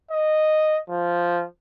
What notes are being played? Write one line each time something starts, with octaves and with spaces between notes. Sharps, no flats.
D#5
F3